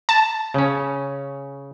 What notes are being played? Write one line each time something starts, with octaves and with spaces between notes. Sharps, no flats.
A5
C#3 C#4